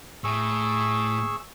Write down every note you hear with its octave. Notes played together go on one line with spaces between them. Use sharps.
A2 G#4 C#6 E6